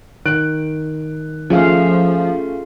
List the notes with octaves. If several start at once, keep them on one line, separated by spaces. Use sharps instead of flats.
D#3 F#6 D7
F3 A3 C#4 F4 G#4 F5